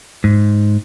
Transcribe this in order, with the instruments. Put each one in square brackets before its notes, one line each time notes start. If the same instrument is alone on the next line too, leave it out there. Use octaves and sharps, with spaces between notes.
[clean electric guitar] G#2